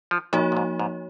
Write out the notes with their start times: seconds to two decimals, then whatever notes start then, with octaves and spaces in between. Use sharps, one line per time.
0.11 F3
0.33 A#2 F3 A#3 D#4 F#4 C#5
0.52 A#2
0.57 G#2
0.79 G#2